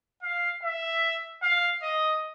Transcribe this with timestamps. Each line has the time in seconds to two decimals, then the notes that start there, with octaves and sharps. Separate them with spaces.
0.23 F5
0.63 E5
1.42 F5
1.83 D#5